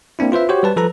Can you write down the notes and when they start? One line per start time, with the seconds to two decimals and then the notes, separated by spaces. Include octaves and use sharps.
0.19 A#3 C4 D4 E4
0.32 F4 B4 C5 E5
0.49 F#4 G4 C5 C#5
0.63 G3 B4 A5
0.76 F3 A4 B4 A#5